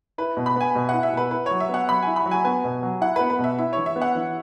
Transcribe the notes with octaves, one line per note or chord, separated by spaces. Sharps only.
E4 B4
B2
B5
B3 G#5
B2
E4 F#5
E5
B2 B4
E4 B4
F#3 C#5
E5
B3 F#5
F#3 B5
E4 G#5
B5
F#3
G#5
B3 G#5
B2
F#3
E4 F#5
B3 B4
B4
B2 E5
E4 E5
E3 C#5
E5
B3
F#5
E3